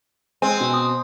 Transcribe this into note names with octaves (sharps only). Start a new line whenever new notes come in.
G#3 C4 G#5
B2
D#6